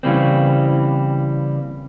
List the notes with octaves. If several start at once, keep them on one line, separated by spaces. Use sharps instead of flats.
C#3 E3 G3 A#3 C4